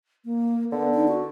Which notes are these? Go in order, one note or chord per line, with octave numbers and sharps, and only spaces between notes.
A#3
D3 B3
D#4
F#4